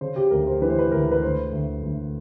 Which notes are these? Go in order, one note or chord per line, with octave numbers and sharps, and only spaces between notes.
C#3 C5
G4
D2 A#4
C5
E3 B4
C5
B4
D2 A#4
B4
D2 C5
D2
D2